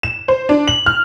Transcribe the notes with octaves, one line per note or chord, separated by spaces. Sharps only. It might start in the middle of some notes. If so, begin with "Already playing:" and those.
E7
C5
D4
F#7
F6